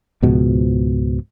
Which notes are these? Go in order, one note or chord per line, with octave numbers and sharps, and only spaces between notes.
C#2 G#2 B2 F3